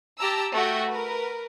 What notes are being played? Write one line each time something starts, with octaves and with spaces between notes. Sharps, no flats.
G4 A5 A#5 E6
A3 F#4 G5
A#4 B4